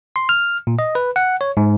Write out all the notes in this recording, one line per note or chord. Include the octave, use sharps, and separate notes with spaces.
C6
F6
A#2
D#5
B4
F#5
C#5
G#2